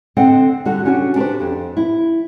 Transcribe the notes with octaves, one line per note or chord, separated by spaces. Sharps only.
D3 C4 A4 D#5 F#5
D3 G3 F#4
C#3 C#4 D4 F#4
D4 G4 B4 C5
F2
E4